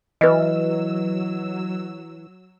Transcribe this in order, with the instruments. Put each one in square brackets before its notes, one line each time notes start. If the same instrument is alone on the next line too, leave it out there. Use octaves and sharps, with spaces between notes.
[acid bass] E3 [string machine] F#3 E6 [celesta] B4 D#5